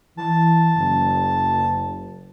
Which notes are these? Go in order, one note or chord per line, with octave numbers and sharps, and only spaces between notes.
E3 A5
F#1